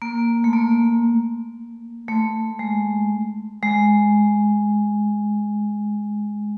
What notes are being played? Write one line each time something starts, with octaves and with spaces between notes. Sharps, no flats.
A#3
A3
A#3
A3
G#3
G#3